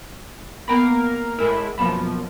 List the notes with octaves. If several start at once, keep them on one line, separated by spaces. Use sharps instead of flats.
A#3 B3 A#4 F5 G5 B5
A2 G#3 E4 A#4
F#2 B2 F3 A#3 A5 B5